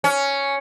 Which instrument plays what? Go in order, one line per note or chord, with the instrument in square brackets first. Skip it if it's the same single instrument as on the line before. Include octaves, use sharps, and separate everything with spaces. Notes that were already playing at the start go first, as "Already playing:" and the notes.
[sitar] C#4